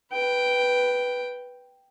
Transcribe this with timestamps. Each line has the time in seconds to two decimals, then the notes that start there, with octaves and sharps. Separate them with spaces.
0.12 B4 G5